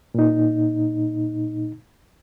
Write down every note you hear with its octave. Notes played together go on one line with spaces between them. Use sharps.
A#2 D#4